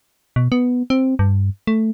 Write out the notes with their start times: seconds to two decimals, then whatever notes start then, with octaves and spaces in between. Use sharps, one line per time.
0.36 B2
0.52 B3
0.90 C4
1.19 G2
1.67 A3